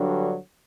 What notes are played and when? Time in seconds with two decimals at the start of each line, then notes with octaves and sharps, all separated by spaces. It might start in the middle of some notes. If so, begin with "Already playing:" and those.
Already playing: G2 D3 F#3